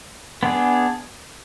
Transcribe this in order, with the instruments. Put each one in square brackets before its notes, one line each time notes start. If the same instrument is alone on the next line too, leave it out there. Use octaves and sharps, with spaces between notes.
[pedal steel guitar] B3 D4 G#4